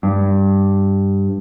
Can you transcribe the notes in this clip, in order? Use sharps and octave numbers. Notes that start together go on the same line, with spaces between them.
G2